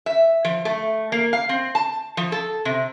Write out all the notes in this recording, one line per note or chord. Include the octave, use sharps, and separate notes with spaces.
E5
F3
A3
A#3
F5
C4
A5
F3
A4
C3